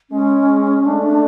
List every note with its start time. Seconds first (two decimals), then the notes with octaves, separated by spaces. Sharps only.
0.10 G#3 C#4
0.86 A3 D4